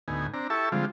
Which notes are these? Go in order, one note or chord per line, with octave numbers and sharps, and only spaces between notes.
D2 A2 B3 D#4 G#5
C4 D4 A#5
E4 G4 A4 E5 A5 C#6
D3 F3 G3 G#3 C4 F4